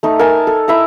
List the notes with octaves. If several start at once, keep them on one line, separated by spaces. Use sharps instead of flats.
A3 D#4
A#4 G#5 A5
A4
E4 E5 A#5